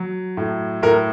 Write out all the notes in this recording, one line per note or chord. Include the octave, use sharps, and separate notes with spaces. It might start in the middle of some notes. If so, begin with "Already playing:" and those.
Already playing: F#3
A2
A2 A#4